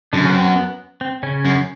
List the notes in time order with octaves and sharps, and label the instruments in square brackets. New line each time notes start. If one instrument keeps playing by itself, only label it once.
[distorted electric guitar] F#2 [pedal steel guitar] D3 D4
[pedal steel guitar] C#3 C#4
B3
C4
B3
C4
C#3 C#4
[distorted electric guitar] F#2